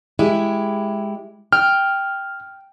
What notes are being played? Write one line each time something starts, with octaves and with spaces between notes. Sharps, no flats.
G#3 E4 G4
G5 F6